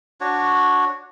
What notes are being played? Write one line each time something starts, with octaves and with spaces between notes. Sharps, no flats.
D4 F#4 C#5